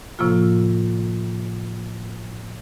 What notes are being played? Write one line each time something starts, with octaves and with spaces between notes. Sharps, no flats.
A2 C3 F3 A#3 F4